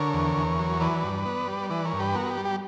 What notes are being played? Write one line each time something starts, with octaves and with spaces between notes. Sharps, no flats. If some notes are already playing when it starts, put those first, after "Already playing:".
Already playing: D3 A#4 C#5
E2
E2
F#3
E3 B4 D5
G2
B3
G3
E3 B4 D5
A#4 C#5
G2
G4 B4
B3 F#4 A#4
G4
G3
G4